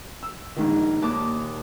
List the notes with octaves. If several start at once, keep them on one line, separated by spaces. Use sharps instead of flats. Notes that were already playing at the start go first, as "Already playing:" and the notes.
E6
A#1 G#2 D#3
D#2 A#2 A5 D6